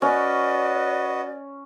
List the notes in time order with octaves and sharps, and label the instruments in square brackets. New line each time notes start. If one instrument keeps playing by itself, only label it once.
[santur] C#4 [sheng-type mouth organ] F#4 B4 D#5 [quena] D5